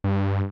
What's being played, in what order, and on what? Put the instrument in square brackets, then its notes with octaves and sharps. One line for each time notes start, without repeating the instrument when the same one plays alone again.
[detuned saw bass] G2